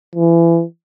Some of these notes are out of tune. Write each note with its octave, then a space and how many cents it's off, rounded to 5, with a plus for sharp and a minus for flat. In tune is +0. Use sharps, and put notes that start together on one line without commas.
E3 +30